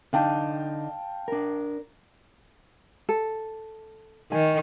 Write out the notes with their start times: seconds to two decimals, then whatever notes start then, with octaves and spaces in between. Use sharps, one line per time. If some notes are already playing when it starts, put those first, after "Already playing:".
0.13 D3 D4 D#4 F5 G5 A5
1.28 D4 A#4
3.09 A4
4.32 D#3 G#5